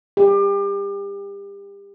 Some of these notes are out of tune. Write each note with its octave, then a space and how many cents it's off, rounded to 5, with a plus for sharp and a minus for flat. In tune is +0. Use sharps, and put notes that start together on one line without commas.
G4 +30